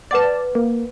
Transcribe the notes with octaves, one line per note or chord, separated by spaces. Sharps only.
B4 D5 F#5 A5 D6
A#3